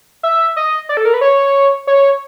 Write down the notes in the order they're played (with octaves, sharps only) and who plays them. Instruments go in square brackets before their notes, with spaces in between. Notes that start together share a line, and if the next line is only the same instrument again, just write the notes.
[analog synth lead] E5
D#5
D5
A4
A#4
B4
C#5
C#5